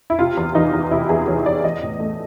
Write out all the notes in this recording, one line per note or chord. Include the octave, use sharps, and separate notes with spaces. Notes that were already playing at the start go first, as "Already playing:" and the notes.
E4
C3 F4
E2
E3 D#4
E2
C3 E4
E2 G#4
E3 C#5
E2 D5
E3 D#5
A2
A3